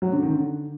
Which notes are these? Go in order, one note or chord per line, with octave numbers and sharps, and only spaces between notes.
F#3
D3
D#3
D3